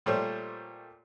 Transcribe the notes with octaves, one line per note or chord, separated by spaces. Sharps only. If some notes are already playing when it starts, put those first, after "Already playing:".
A#2 G3 A3 C5 C#5